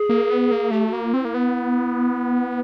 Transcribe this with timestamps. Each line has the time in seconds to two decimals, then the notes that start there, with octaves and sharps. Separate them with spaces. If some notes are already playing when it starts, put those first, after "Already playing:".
Already playing: G#4
0.09 A#3
0.30 B3
0.51 A#3
0.71 A3 G4
0.87 F#4
0.93 A#3
1.03 F4
1.14 C4
1.19 E4
1.25 A#3
1.34 B3